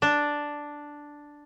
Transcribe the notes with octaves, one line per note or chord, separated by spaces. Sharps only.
D4